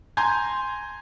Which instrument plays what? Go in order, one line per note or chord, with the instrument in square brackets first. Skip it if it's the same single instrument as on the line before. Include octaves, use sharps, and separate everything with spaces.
[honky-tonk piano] G#5 A#5 C6 G6 G#6